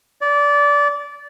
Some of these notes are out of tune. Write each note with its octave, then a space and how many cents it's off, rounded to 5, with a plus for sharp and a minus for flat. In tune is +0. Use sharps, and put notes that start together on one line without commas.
D5 -20